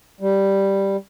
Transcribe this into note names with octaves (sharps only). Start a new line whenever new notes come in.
G3